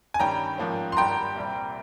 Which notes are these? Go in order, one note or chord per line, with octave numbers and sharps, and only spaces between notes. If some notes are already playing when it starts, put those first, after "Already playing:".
G#5
G2 D#3 G3 C#4 G5 A#5
G#2 F3 A#3 C#4
C6
G#1 G2 G3 G5 A#5
C2 A#2 G3 C4